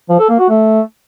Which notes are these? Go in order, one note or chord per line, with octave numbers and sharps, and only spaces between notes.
F3
A4
A#3
F#4
A3